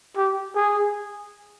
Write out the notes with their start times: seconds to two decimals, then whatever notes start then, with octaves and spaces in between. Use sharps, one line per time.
0.17 G4
0.55 G#4